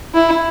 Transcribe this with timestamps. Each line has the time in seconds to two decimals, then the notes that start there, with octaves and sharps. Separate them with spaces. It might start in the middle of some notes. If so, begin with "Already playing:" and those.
0.14 E4